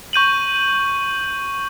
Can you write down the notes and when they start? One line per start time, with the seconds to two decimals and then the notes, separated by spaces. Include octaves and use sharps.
0.13 C#6 G6 D#7 F#7